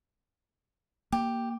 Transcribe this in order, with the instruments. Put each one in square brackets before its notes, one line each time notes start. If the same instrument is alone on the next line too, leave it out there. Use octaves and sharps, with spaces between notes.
[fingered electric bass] A#3 [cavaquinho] G4